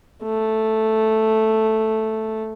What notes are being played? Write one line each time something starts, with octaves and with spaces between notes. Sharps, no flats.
A3